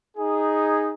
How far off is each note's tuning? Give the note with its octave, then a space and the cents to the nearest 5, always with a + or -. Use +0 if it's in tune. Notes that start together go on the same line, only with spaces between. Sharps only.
D#4 +0 G#4 -10